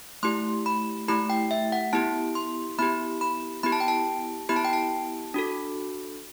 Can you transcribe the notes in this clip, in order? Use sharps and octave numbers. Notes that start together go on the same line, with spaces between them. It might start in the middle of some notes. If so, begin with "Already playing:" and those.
A3 E4 G4 C6
B5
A3 E4 G4 B5
G5
E5
F#5
B3 E4 G4 A5
C6
B3 E4 G4 B5
B5
B3 E4 G4 B5
A5
G5
A5
B3 E4 G4 B5
A5
G5
A5
D4 F#4 A4